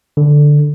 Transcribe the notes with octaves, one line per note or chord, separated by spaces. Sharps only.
D3